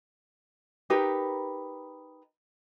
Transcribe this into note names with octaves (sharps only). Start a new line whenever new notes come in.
D#4 G4 A#4 B4